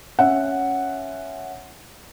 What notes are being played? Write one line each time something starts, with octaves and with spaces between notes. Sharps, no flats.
C#4 E5 F#5